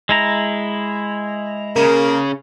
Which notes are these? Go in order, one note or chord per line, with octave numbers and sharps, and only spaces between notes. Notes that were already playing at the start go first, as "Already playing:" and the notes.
G#3 E4 A#5
C#3 A#3 A#4